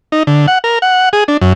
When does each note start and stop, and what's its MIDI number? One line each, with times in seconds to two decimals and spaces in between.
0.12 0.23 63
0.27 0.46 50
0.48 0.58 78
0.64 0.79 70
0.82 1.09 78
1.13 1.24 68
1.28 1.37 62
1.41 1.53 42